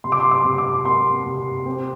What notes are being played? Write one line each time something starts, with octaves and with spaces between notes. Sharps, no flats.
C3 C6
D6
C6
D6
C3
D6
A#3 C6
C3
C4